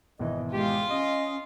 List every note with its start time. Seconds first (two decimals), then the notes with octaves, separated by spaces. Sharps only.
0.19 G#1 B2 E3 D#5
0.53 G#3 F4 G4 F5
0.90 C#4 D#5 D#7